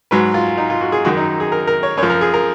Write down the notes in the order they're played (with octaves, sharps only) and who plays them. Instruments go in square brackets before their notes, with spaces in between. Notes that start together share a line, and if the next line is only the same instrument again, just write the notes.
[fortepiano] G#2 F#3 B4
F4
D#4
F4
F#4
G#4
F#2 D#3 F#3 F#4
D#4
G#4
A#4
A#4
C#5
F#2 C#5
F3
A#4
G#4
A#4